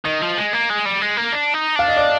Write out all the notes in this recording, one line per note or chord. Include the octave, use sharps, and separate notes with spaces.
D#3 D#5
F3
G#3
A#3
G#3
G3
G#3
A#3
D4
D#4
D4 F5
D#5
D5